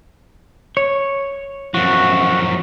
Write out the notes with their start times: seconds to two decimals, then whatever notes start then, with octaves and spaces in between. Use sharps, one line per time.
0.77 C#5
1.74 F#2 F3 F#4